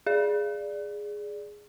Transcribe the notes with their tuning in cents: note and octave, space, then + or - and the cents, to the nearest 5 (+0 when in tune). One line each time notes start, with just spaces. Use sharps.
G#4 +0 D5 +0